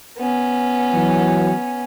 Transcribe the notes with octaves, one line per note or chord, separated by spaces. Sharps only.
B3 C#4
E3 F#3